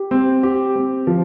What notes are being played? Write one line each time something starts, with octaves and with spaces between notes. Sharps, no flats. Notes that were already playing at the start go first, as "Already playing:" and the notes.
Already playing: G4
C4
G4
C4
F3